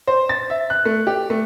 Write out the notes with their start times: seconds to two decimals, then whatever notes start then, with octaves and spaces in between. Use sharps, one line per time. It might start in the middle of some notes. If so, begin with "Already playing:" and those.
0.07 C5
0.29 A6
0.50 E5
0.70 F#6
0.85 A3
1.07 G4
1.30 A3